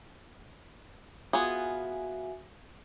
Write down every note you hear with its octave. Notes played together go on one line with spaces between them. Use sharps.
B3 F4 F#4 G#4 E5 G#5